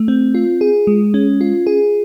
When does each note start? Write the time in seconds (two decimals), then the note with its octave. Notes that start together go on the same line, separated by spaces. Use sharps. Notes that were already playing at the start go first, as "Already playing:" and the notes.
Already playing: A3
0.08 C4
0.35 F4
0.61 G#4
0.87 G#3
1.14 C#4
1.41 F4
1.67 G#4